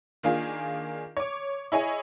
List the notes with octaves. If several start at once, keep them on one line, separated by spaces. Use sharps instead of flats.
D#3 A#3 D4 F4 G#4
C#5 D6
E4 G#4 C#5 D#5 G#5